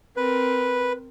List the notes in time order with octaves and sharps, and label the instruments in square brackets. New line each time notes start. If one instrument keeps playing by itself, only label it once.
[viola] C4 A#4 [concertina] B4